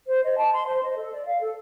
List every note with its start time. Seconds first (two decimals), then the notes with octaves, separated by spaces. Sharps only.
0.08 C5
0.23 D#5
0.38 A5
0.53 C6
0.67 C5
0.83 D#5
0.97 A4
1.12 D5
1.26 F5
1.40 A4